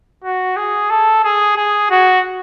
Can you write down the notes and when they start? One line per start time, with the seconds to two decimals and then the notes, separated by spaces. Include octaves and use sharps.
0.24 F#4
0.56 G#4
0.90 A4
1.24 G#4
1.57 G#4
1.90 F#4